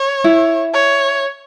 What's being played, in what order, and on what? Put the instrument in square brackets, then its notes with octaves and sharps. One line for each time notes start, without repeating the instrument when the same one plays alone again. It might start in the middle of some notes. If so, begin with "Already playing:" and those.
Already playing: [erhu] C#5
[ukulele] E4
[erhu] C#5